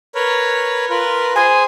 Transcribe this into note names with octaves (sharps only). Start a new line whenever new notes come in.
A#4 B4 C#5
F4 A#4 B4
G#4 C5 G#5